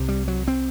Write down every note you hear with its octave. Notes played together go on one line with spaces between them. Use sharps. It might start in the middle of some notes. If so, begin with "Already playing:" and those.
Already playing: C2 C3
G3
F#3
C4